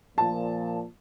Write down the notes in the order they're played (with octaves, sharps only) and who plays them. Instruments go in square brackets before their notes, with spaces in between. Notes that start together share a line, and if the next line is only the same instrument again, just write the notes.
[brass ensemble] A#2 F3 [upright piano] A5